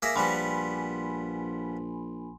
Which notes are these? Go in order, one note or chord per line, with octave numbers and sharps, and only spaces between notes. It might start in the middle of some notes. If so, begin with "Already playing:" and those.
A#3 G#4 E5 D6 A#6
A#1 F3 G3 B3 G#5 B5 C6